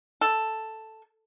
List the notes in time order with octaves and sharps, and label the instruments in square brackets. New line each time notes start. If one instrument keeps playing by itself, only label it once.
[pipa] A4